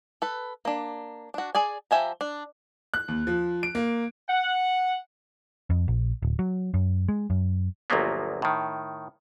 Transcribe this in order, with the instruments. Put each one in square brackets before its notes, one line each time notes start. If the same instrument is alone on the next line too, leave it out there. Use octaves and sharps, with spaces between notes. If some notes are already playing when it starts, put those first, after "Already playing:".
[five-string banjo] A4 B4
A#3 D4
D4 F#4
G#4 D5 G#5
F3 G4 E5 G#5 A#5
D4
[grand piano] F#6
D#2
F3
D7
A#3
[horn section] F#5
[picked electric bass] F2
A#1
D1
F#3
F#2
G#3
F#2
[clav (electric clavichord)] G1 D2 F3 F#3 A#3 B3
A2 D#3